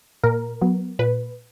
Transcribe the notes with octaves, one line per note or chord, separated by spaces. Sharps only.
A#2 A#4
F#3 B3
A#2 B4